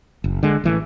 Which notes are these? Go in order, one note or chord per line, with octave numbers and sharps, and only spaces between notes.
F#1
D3 G#3
A1 E3 A3